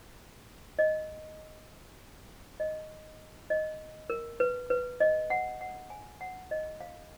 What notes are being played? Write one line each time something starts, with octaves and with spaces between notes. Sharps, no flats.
D#5
D#5
D#5
A#4
B4
B4
D#5
F#5
F#5
G#5
F#5
D#5
F5